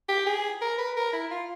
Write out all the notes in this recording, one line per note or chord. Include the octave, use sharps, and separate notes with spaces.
G4
G#4
A#4
B4
A#4
E4
F4